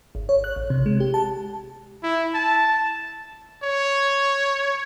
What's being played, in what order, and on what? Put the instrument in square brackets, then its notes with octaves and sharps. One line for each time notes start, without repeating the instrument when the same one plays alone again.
[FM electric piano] G#1
C#5
F#6
A1
C3
G#3
G4
A5
[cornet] E4
A5
[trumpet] C#5